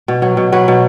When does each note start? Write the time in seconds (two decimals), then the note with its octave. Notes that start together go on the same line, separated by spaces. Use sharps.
0.08 B2
0.22 F#3
0.37 B2
0.52 F#3 B4
0.68 B2